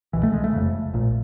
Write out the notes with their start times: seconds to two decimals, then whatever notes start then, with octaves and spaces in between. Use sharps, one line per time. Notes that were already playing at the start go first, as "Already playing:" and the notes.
0.13 C2 B2 E3
0.23 A3
0.33 G#3
0.44 A3
0.53 F1 F2 C#3
0.94 A#1 A#2